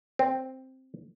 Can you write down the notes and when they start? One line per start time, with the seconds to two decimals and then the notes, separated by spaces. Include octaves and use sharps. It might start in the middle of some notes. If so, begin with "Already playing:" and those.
0.19 C4